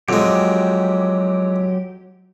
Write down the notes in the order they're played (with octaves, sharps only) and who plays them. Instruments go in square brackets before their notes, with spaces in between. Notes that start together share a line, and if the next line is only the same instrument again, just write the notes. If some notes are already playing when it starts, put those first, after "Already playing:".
[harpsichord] F2 G#3 [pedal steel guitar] F#3 G4